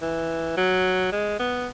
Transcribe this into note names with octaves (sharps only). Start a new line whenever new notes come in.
E3
F#3
G#3
B3